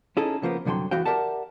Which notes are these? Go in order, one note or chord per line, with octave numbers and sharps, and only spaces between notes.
C#4 D#4 E4 G#4 A4
C#3 F3 A#3 B3
C2 F#2 D3 F#3 G5 C6
C#2 E3 B3 F#4 F5 G5
G4 A#4 D5 E5 F#5 A5